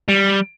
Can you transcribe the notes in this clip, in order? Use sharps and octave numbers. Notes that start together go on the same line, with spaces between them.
G3